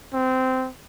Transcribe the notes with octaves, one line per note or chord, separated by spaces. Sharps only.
C4